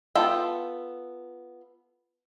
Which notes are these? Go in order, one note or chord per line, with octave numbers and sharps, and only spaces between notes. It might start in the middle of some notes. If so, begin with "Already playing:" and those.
B3 F4 A4 G5